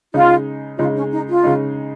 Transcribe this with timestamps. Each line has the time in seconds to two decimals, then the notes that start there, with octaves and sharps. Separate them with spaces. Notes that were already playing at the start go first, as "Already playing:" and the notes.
0.14 C#3 G#3 D#4 F4
0.78 C#3 G#3 D#4 F4
0.95 C#4
1.12 D#4
1.28 F4
1.43 C#3 G#3 D#4